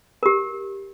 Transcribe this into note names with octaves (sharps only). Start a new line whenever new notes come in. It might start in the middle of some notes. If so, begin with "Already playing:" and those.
G4 A#4